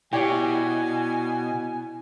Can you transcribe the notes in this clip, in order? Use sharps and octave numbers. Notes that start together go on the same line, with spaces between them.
B2 E4 G4 C#5 D5 G#5